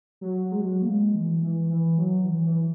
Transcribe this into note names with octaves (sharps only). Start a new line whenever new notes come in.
F#3
G#3
F#3
A#3
G#3
E3
E3
E3
F#3
E3
E3